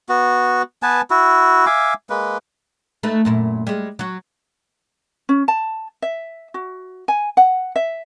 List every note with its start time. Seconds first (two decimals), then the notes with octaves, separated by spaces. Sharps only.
0.09 B3 F#4
0.83 B3 B4 G#5 A5
1.10 E4 F#4
1.66 E5 F5 G#5 D6
2.10 G#3 A#3 B4
3.03 A3 D#4 B4
3.25 F#2 A#2 E4
3.67 G3 G#3
3.99 F#3 F#4
5.29 C#4
5.48 A5
6.02 E5
6.54 F#4
7.08 G#5
7.37 F#5
7.76 E5